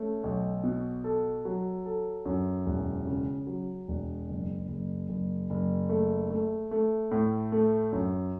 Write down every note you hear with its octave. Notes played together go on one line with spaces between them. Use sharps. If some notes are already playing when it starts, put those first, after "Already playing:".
Already playing: A3 C#4
B1
B2
A4
F#3
A4
F#2
E1
C#3
F#3
E1
F#1
F#1
F#1
F#1
A3
A3
A3
A2
A3
F#2